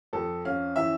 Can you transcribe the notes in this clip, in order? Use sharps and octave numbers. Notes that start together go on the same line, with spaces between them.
F2 A4
C#4 F5
E3 E5